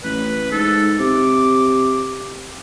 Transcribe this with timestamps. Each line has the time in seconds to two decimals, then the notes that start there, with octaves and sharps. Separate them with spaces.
0.04 A1 B4
0.52 G#2 A4
1.00 C3 D6